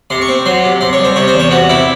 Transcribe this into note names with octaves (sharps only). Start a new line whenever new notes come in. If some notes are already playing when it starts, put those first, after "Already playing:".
C3 C6
C#6
C4
F#3 C6
C3
C3 C6
C#5
C2
C5
C3 C#5
C5
E2
C#5
C3 F#4
C3 E4